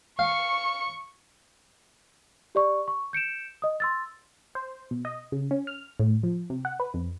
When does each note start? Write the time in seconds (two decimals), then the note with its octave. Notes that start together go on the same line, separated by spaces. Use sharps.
0.19 F5 C#6 C#7
2.55 G4 D5 C#6
2.88 C#6
3.13 G6 C#7 D7 E7
3.62 D#5 D#6
3.80 C6 E6 A6
4.55 C5
4.91 B2
5.05 D#5
5.32 C#3
5.51 C#4
5.67 F6
5.99 A2
6.23 F3
6.50 C3
6.65 F#5
6.80 B4
6.94 F2